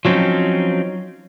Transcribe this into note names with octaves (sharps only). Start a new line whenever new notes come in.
F3 F#3 C4 C#4 D#4